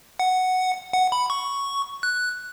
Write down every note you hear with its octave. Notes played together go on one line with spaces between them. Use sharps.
F#5
F#5
B5
C#6
F#6